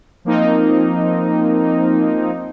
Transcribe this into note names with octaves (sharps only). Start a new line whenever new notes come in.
F3 A#3 C4 D#4